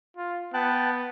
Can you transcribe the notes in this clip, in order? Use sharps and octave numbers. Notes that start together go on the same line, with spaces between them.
F4
B3 G5 A5 F#6